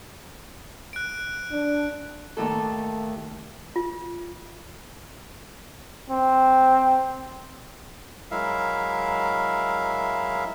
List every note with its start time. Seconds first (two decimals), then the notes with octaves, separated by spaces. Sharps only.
0.93 F#6 D7
1.52 D4
2.37 D#2 A2 A4
3.76 F4
6.10 C4
8.31 F#3 G#3 E4 A#4 E5 F5